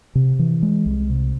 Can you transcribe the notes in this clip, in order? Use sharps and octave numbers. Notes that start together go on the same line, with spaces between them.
C3
E3
G#3
C2
C3